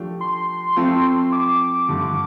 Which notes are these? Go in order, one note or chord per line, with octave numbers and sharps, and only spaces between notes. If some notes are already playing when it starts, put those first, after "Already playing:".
Already playing: F3 A3 D4 G4
C6
F3 A3 C4 F4
D6
G2 D3 A3